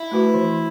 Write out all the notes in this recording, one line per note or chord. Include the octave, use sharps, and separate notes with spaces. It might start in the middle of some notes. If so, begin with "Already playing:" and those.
Already playing: E4
A3 F#4 B4
E3